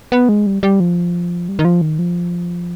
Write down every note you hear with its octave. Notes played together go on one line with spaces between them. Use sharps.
B3
G#3
G3
G3
F3
G3
D#3
F3
D#3
F3